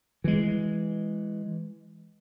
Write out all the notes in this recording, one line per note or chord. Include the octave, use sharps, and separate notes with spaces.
E3 G#3